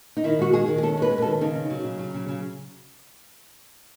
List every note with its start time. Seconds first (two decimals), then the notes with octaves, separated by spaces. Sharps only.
0.17 D#4
0.24 D#3 E4
0.39 G#3 F#4
0.53 G#3 G#4
0.68 D#3
0.78 G#4
0.83 C#4 A4
0.97 G#3 B4
1.11 C#4
1.18 B4
1.22 A4
1.27 D#3
1.41 C#3 D#4
1.55 C#4
1.70 F#3
1.84 C#3
1.99 F#3
2.14 C#3
2.29 C#3